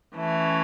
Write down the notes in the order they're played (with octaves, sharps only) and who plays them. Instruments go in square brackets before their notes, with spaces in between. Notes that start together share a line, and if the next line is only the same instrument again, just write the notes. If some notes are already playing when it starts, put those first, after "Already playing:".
[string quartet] E3 A3 C#4